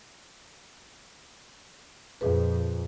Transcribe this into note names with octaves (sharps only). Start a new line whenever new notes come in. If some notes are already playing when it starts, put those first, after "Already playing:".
F2 A#2 G#4 B4